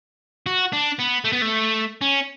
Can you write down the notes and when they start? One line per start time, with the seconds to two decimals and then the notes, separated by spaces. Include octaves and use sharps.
0.46 F#4
0.72 D4
0.99 B3
1.24 A3
1.32 B3
1.42 A3
2.01 C#4